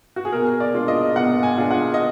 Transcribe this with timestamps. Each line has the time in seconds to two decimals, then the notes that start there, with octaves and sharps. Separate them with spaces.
0.16 F#4
0.25 G#4
0.33 B2 A#4
0.60 D5
0.74 G#3 D4 F4
0.88 D#5
1.16 B2 F#5
1.43 G#5
1.58 G#3 D4 F4
1.71 F#5
1.94 D#5